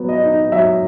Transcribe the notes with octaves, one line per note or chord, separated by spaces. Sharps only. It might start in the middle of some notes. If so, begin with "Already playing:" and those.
Already playing: F#3 B3
D#5
D#4
F#3 E5